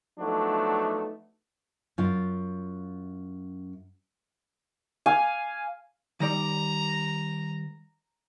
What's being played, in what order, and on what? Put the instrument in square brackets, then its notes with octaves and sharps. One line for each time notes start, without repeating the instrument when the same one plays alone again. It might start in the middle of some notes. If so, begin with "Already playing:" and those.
[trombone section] F3 F#3 A3 B3 D4 D#4
[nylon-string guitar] F#2 F4
[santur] F5 G#5
[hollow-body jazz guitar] D#3 G3 D5 [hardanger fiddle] A#5